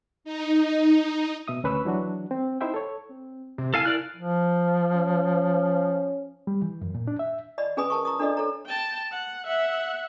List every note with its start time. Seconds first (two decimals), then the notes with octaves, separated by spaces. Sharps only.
0.24 D#4
1.48 B2 E5 D#6
1.64 D2 C#4 B4 B5 C#6 E6
1.85 E3 F#3 D4 F#4
2.31 C4
2.61 D#4 E4 C5 E5 G5
2.74 A4 C#5
3.09 C4
3.58 C3 C4
3.74 E4 A4 F5 G#5 F6
3.85 E4 A#4 D5 F#6
4.17 F3
4.93 C#4
6.47 G3
6.62 E3
6.81 F#2
6.95 A#2
7.08 D4
7.19 E5
7.58 D5 D#5 B5
7.77 C#4 G#4 B4 G#5 B5 D#6
7.90 A#4 A5 C#6
8.05 A#5 C#6 D#6
8.19 D4 A4 D5 D#5
8.37 A4 C#5 A#5
8.66 G5 A5
9.11 F#5
9.47 E5 F#5